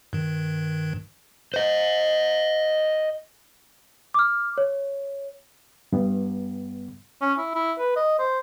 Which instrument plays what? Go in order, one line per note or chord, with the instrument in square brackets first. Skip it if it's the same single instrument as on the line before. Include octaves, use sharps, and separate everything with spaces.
[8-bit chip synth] G2 D#3
[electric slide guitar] C5 D#5
[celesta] D6 F6
C#5
[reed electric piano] G2 B3
[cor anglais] C#4
E4
E4
B4
D#5
C5